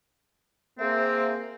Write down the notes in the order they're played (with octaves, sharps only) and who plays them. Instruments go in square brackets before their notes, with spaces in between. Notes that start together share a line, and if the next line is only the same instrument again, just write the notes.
[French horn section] A#3 G#4 C5 [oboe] C4 [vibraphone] E5